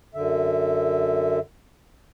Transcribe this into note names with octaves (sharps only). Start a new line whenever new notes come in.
F#2 D3 E5